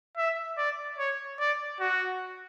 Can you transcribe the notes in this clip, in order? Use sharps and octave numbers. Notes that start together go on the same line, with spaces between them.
E5
D5
C#5
D5
F#4